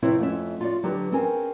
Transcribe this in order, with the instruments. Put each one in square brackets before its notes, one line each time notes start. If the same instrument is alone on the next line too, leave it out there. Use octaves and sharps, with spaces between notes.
[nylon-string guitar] F2 C3 C4 E4 B4 C#5
F2 A3 C#4 E5
F4 F#4 D5
D3 F#3 G4 B4
C4 C#4 G#4 A#4 G#5